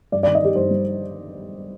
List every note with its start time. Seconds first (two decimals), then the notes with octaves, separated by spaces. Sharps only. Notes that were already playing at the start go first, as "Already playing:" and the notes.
0.12 G2 D5
0.23 D5
0.27 D#3
0.35 D#5
0.41 D#3 G4
0.55 G2 C5
0.70 G3